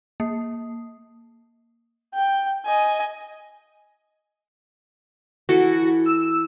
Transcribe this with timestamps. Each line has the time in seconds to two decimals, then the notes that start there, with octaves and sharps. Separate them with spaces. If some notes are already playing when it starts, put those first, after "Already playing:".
0.20 A#3
2.14 G5
2.65 D#5 G#5
5.49 E3 E4 F#4 A4
6.06 E6